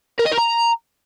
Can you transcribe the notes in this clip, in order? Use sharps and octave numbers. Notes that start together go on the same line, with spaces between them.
A#4
D#5
A#4
A#5